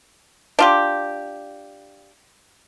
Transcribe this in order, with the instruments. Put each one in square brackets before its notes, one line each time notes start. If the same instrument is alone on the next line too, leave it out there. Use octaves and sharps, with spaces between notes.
[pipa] D4 F4 G4